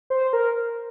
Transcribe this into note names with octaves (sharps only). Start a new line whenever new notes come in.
C5
A#4